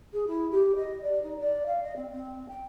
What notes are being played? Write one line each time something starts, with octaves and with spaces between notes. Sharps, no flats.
G#4
E4
G4
D#5
D5
D#4
D5
F5
D#5
C4
C4
G5